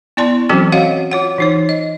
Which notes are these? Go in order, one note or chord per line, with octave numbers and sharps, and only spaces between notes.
B3 E4 D5 A5 C6
E3 F#3 C4 C#4 F#4 A4
F#4 C#5 D#5 F5 F#5
F4 C#5 F#5
E3 D#4 C#5
D#5